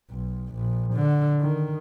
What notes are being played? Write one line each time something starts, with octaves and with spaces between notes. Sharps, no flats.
B1
A#1
D3
D#3